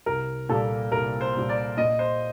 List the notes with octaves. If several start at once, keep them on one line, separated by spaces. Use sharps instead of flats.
C2 A#4
A#2 G3 A#3 A4
C2 A#4
C5
A#2 G3 A#3
D5
A#2 D#5
C5